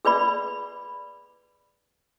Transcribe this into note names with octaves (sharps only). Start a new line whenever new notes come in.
G#4 B4 D5 B5